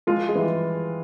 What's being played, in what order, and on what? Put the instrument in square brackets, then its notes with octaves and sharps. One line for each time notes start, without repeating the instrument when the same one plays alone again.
[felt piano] F3 G#3 [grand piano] F4
[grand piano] G#3
[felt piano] E3 G3